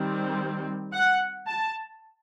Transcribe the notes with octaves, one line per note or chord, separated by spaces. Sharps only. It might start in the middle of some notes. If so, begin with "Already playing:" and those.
Already playing: D#3 G3 C4
F#5
A5